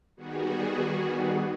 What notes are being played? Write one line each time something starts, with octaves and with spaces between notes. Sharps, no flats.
D#3 G3 B3 F#4 G#4